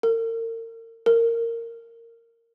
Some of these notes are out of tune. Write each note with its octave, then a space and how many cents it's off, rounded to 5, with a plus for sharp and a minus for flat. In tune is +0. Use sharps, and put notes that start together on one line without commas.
A#4 -40
A#4 -15